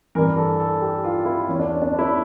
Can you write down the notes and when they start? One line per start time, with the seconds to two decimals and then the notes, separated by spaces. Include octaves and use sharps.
0.15 G2 E3 A#4
0.37 A4
0.60 A4
0.81 G4
1.04 F4
1.26 E4
1.48 E2 E3 C#4
1.59 D4
1.65 C#4
1.82 D4
1.94 D4
1.99 E4